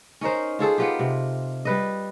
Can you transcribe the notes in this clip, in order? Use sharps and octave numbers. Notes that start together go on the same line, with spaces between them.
C#4 D#4 A#4 C5
F4 G#4 A4 C5
B3 F4 G4
C3
G3 B4 D#5